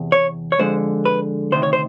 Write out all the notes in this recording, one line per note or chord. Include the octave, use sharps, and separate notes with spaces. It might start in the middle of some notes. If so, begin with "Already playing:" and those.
Already playing: E2 C3
C#5
C#5
F2 D3 F3 G#3 C5
B4
D2 C3 D#3 C5
C#5
C5